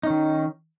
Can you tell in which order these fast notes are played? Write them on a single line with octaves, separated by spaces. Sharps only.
D#4 C#4 D#3